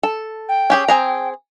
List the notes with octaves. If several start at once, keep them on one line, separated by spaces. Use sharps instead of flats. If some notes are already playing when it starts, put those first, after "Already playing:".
A4
G5
C#4 G4 G#4
C4 G#4 A#5